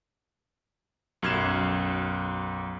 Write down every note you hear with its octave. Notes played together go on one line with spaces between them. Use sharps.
B1 F#2 F6 G#6 C7 E7